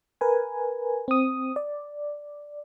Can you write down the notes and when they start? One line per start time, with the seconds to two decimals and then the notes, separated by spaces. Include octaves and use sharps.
0.21 A#4 B4 G#5
1.08 C4 D#6
1.56 D5